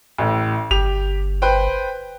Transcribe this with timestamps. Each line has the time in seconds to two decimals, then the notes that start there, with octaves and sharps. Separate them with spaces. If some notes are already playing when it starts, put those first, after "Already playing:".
0.18 A1 A2
0.71 G1 G4 F7
1.42 B4 C5 G5